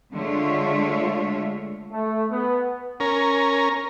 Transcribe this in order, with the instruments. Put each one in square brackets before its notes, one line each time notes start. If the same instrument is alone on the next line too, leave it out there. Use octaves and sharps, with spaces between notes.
[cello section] D3 G#3 A3 F4 C#5 E5
[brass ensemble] A3
B3
[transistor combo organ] C#4 A#4